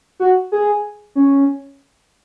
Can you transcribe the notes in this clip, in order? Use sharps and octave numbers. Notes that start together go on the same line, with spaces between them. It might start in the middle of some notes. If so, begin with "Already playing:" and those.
F#4
G#4
C#4